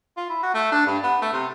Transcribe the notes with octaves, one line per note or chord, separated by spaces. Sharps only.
F4
E4
F#4
A3
D4
G2
B3
A3
C3